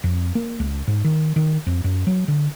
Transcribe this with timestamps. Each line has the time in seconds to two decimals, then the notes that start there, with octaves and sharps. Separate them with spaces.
0.04 F2
0.35 A#3
0.60 C#2
0.88 G#2
1.05 D#3
1.36 D#3
1.67 F2
1.84 F#2
2.07 F#3
2.28 D3